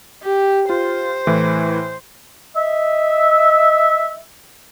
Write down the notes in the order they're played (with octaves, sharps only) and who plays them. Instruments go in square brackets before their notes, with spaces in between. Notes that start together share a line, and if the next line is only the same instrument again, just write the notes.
[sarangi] G4
[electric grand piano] F4 [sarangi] C5
[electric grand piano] A2 E3
[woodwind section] D#5 E5